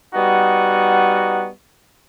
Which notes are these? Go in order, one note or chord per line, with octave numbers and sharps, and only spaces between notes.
G3 B3 D#4 F#4